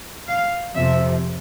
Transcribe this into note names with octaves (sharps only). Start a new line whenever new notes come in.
F5
F2 C3 F3 E5